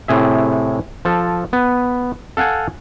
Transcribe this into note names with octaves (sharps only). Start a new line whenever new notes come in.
A2 C3 G#4 E5
F3 A4
B3
A4 F5 F#5 G#5